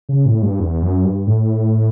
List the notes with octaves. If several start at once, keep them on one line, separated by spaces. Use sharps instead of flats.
C#3
A2
G2
E2
F#2
G2
A2